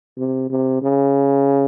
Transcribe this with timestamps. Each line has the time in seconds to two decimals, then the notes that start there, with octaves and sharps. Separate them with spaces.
0.17 C3
0.50 C3
0.82 C#3